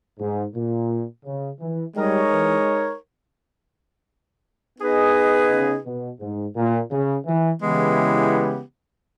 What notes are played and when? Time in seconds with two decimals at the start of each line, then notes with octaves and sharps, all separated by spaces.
0.20 G#2
0.55 A#2
1.26 C#3
1.61 E3
1.97 G3 G#3 D#4 A#4 C#5
2.31 E3
4.79 B3 D#4 G#4 B4 D#5
5.51 C#3
5.86 B2
6.21 G#2
6.56 A#2
6.92 C#3
7.26 E3
7.62 C#3 E3 G#3 B3 E4 G4